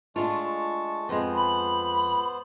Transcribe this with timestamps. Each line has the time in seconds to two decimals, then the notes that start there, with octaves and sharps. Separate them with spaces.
0.16 G#3 A3 D4 F4 A5 C#6
1.09 F2 G#3 B3 C5
1.35 B5